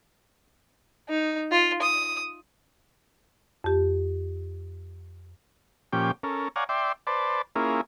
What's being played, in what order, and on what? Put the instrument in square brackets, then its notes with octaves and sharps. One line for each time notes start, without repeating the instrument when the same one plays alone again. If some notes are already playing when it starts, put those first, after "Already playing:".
[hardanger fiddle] D#4
F4
D#6
[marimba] F2 G4
[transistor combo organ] A#2 F3 C#4 G4 G5
C#4 A4 A#4
C#5 D5 F5 F#5 G#5 A#5
D5 E5 G5 C6
B4 C5 D5 A5
A#3 C#4 E4 F4 G#4 A#4